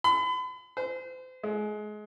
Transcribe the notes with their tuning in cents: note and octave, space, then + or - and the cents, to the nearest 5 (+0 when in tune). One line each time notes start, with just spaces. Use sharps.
B5 +40
C5 -35
G#3 +25